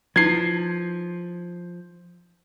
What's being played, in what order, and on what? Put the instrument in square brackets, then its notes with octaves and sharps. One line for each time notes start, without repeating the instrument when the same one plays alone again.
[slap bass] F3 [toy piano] D#4 E4 B4 [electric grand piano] G#6 C7